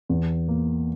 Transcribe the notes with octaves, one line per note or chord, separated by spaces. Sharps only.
E2
A#3